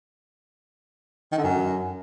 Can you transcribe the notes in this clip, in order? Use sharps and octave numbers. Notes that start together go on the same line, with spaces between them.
D#3
D3
F#2